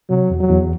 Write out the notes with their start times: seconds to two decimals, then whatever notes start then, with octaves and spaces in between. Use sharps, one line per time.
0.09 C3 F#3
0.30 E2
0.40 F#3
0.50 E2